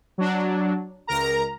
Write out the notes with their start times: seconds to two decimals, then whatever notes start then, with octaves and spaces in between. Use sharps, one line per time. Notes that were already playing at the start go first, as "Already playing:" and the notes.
0.18 F#3 D4
1.07 C#2 A#4 A#5